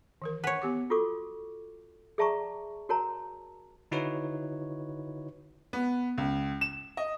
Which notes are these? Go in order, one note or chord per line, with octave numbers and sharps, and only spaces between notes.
D#3 E3 A#4
B4 C#5 F#5 G#5
B3 G4 D6
F4 F#4 A4 C#6 D6
G#4 D5 E5 A5 A#5 C#6
F#4 A#4 C#5 A5 A#5
D3 D#4 E4 F#4 B4 C#5
B3
C#2
E7
D#5